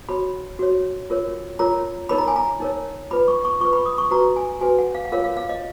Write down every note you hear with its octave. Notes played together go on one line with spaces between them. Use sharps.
F#4 C#5 B5
F#4 C#5
F4 A#4 C#5
F4 A#4 C#5 A#5
D#4 A#4 C#5 B5
A#5
G#5
A#5
D#4 A#4 C#5
F4 B4 B5
C#6
C#6
F4 B4 C#6
B5
D#6
C#6
F#4 B4 A#5
G#5
F#4 B4 G#5
F#5
F5
F#5
F4 A#4 C#5 F5
F5
F5
D#5